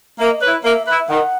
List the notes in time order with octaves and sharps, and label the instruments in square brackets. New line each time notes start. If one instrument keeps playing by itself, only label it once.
[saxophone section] A#3 [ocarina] E5
[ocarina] D#5
[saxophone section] E4 B4 [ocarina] C#5
[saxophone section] A#3 [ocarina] E5
[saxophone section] E4 B4 [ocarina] E5
[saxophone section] D#3 [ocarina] F#5